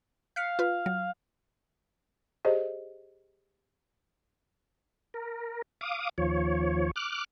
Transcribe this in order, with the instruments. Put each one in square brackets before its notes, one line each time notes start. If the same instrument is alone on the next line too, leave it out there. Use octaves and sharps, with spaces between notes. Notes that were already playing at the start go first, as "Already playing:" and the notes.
[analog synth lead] F5 [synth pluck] F#6 B6 C#7
[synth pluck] F4 B4
F#3
[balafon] G4 G#4 C5 D5 D#5
[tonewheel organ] A#4
F5 D6 D#6
D#2 F3 C#5
D6 F6 F#6